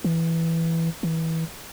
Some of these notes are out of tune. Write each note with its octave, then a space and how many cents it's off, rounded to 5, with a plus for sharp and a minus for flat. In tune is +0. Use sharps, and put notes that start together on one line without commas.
E3 +0
E3 -25